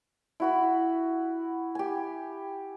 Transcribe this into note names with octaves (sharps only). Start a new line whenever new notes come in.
E4 F#4 B5
G4 G#5